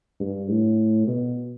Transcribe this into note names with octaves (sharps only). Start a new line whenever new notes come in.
G2
A2
B2